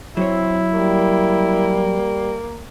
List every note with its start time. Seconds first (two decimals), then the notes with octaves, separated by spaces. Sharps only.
0.17 F#3 C4 E4 C#5
0.73 G3 A#3